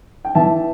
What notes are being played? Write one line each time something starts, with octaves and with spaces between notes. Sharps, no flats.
G5
E3 E5 A5